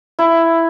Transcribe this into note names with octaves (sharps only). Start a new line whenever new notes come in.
E4